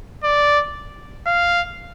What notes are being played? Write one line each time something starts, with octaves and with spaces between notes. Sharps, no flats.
D5
F5